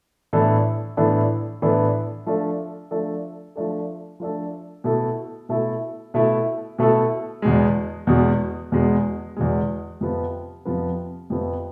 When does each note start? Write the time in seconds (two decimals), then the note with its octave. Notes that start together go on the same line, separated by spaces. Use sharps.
0.33 A2 E3 B3 D4 A4
0.97 A2 E3 B3 D4 A4
1.62 A2 E3 B3 D4 A4
2.26 F3 A3 D4 A4
2.91 F3 A3 D4 A4
3.56 F3 A3 D4 A4
4.20 F3 A3 D4 A4
4.84 B2 A3 E4 A4
5.49 B2 A3 E4 A4
6.14 B2 A3 E4 A4
6.79 B2 A3 E4 A4
7.42 E2 B2 G#3
8.07 E2 B2 G#3
8.72 E2 B2 G#3
9.37 E2 B2 G#3
10.01 F2 C3 F3 B3
10.65 F2 C3 F3 B3
11.30 F2 C3 F3 B3